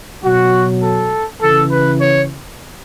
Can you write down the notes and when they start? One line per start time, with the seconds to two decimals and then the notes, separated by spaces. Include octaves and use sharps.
0.25 B2 F#3 F#4
0.84 A4
1.42 C#3 E3 A4
1.72 B4
2.01 C#5